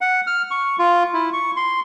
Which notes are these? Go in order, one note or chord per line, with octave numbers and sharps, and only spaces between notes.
F#5
F6
C#6
F4
E4
C#6
C6